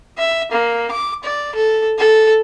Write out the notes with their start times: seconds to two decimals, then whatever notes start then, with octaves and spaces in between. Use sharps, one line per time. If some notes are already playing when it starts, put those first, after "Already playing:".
0.18 E5
0.52 A#3
0.91 D6
1.24 D5
1.55 A4
1.98 A4